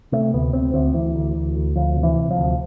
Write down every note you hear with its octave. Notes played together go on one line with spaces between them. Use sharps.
C3 A3
D2 B3
D2 C4
D2 C4
D2 E3
D2
D2
D2
D2 F3
C3
E3
C3
F3
D2